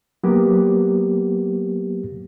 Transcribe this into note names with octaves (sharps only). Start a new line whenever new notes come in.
F#3 A#3 B3 G4